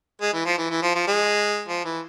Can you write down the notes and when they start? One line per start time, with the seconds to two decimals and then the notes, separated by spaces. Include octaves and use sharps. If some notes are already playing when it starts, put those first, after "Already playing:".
0.22 G#3
0.33 E3
0.46 F3
0.58 E3
0.70 E3
0.82 F3
0.95 F3
1.07 G#3
1.68 F3
1.85 E3